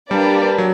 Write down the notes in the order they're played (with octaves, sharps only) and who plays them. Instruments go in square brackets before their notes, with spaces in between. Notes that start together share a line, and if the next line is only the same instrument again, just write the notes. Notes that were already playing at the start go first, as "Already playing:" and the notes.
[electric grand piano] G3 [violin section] A#3 D4 G4 B4 D5
[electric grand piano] F#3